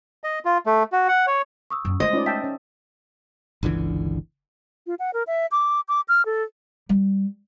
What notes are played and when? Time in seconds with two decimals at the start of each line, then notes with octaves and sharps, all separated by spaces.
0.24 D#5
0.45 F4
0.66 A3
0.92 F#4
1.08 F#5
1.27 C#5
1.70 C#6 D#6 E6
1.85 F#2
2.00 G#3 A3 C5 D#5
2.13 C#4 D#4 F4 D5
2.26 E5 G5 A5 B6
2.44 C#4
3.63 G1 C#2 D3 E3
4.87 F4
4.99 F#5
5.14 A#4
5.27 E5
5.51 D6
5.88 D6
6.08 F6
6.25 A4
6.89 G3